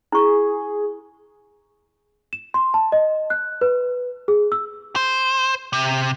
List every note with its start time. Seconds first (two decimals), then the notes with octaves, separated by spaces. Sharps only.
0.12 E4 G#4 C#6
2.33 E7
2.54 C6
2.74 A5
2.92 D#5
3.30 F#6
3.61 B4
4.28 G#4
4.52 E6
4.96 C5
5.73 C3